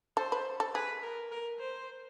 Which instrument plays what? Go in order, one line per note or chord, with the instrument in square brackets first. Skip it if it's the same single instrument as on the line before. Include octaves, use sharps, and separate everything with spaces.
[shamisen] A4 [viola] C5
[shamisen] B4
A4
[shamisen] G#4 [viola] B4
[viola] A#4
A#4
C5